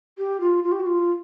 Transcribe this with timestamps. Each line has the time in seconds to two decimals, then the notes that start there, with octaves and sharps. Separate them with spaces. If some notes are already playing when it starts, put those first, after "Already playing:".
0.18 G4
0.40 F4
0.63 F4
0.71 G4
0.79 F#4
0.86 F4